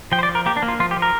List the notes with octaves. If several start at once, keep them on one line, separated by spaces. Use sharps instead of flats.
F3 G5
C5
D5
F3
A#4
A#3 G4
D4
A#3
F4
F3 F4
G4
F3
A#4